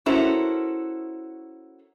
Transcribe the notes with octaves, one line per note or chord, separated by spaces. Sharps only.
C#4 E4 F#4 A4 A#4 C5